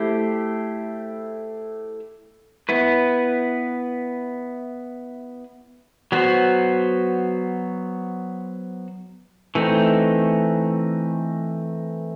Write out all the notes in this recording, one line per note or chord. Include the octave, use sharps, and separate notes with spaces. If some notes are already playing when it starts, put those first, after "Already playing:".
Already playing: A3 E4 G4 C5
B3 E4 B4
F#3 B3 F#4 C5
E3 A3 C4 D#4